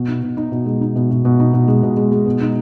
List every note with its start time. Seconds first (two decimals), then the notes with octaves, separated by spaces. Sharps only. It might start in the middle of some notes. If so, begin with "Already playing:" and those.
Already playing: B2
0.08 D#4
0.23 B2
0.37 D#4
0.52 B2
0.66 G#3
0.81 D#4
0.96 B2
1.10 B2
1.25 B2
1.39 D#4
1.53 B2
1.68 G#3
1.83 B2
1.97 G#3
2.12 G#3
2.26 B2
2.41 D#4